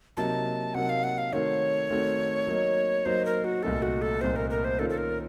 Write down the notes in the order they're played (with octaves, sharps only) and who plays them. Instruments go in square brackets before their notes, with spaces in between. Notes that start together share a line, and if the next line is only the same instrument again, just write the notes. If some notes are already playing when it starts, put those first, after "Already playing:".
[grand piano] C3 F#3 A#3 D#4 [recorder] A5
[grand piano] C3 F#3 A#3 D#4 [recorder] F#5
[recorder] F5
F#5
F5
[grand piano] D#3 A3 C4 F#4 A4 [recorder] C#5
[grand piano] D#3 A3 C4 F#4 A4
F#3 A#3 D#4
[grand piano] F#3 A#3 D#4 [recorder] C5
[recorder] A#4
F#4
[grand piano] C2 A#2 A3 D#4 [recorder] A4
[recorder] F#4
A4
[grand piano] C2 A#2 A3 D#4 [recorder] C5
[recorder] A#4
A#4
C5
[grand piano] D#3 A#3 C#4 F4 [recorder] A4
[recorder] A4
A#4